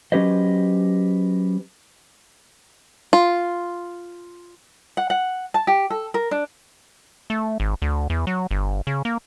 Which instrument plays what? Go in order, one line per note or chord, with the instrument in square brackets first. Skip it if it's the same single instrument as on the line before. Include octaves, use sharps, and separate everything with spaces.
[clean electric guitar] F#3 C#4 G4 B4 C5 D#5
[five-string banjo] F4
[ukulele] F#5
F#5
A5
G4
A4
A#4
D4
[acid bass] A3
G#1
D2
E2
F#3
G1
C#3
A#3